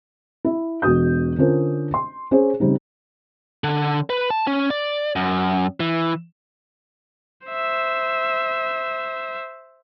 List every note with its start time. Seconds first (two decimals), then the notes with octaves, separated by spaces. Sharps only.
0.45 E4
0.82 E1 B2 F#4 D#6 G6
1.38 D3 C#4 D4 F4 A#4 C5
1.94 C6
2.31 C#4 G#4 C5
2.60 C#3 G3 C4 D#4
3.64 D3
4.10 B4
4.30 A5
4.47 C#4
4.70 D5
5.16 F#2
5.80 E3
7.47 C5 E5